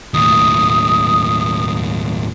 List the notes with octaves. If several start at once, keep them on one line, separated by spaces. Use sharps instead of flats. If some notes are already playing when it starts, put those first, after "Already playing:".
D#2 A2 D#6